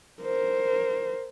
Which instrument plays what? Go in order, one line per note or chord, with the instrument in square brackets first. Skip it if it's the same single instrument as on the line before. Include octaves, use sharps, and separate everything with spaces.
[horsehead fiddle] A#4 C5